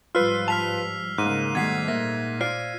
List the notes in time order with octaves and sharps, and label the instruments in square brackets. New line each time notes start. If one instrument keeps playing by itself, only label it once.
[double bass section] G#2 F3 G3 [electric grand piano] F4 B4 [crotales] E6 F6 C7
[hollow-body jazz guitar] A5 [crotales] F6 B6 F7
[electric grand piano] G#2 [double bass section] C#3 A#3 [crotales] F#6 D#7
[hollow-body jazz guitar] B2 D#3 F#5 [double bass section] G3 A3 [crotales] G#6 B6 C7
[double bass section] A#2 [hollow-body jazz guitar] A#3 E5 [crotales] A#6
[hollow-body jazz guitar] F4 C5 D5 [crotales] F6 C7